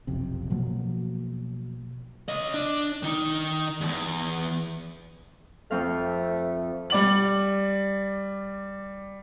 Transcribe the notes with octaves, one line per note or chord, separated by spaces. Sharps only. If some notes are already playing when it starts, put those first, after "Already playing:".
F#1 B1 F2 C3
B2 F3 F#3 A#3
C#3 D#5
D4
D#3 D#4
E2 G2
F2 A3 C4 F5
G3 D5 F#7